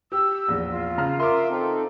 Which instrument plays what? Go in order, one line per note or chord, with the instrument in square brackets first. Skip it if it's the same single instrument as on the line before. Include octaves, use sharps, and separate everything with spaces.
[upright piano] G4 [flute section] E6
[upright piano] A#1 E2
[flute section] F4
[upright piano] C#3 A#5 F6
[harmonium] A#4 E5 [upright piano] C6 D6
[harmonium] C4 D#4 A4